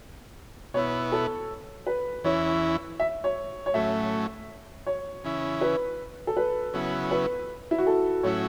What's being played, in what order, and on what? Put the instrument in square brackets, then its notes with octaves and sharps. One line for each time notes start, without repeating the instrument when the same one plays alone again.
[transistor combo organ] B2 B3 E4 [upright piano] C#5
[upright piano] A4
B4
[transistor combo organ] E2 E3 C#4 E4 [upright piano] C#5
[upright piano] E5
C#5
C#5
[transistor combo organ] A2 F#3 A3 C#4 [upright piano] E5
[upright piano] C#5
[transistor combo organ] C#3 E3 C#4 E4
[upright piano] B4
A4
B4
[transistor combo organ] C#3 F#3 B3 E4
[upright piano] B4
E4
F#4
A4
[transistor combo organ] A2 F#3 C#4 E4 [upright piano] C#5